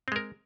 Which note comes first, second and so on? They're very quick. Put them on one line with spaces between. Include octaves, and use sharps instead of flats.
C4 G#3 A#4